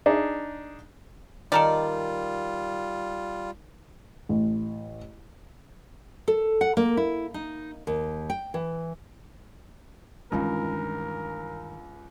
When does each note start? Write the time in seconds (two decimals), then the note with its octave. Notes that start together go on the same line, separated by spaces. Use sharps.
0.06 D4 D#4 G#4
1.52 D#3 G3 F4 A4 A#4 D5
4.29 A1
6.28 A4
6.61 F#5
6.77 A#3
6.97 E4
7.34 D#4
7.87 D#2
8.30 G5
8.54 E3
10.32 C#2 G2 D#3 E3 D4 F4 A#4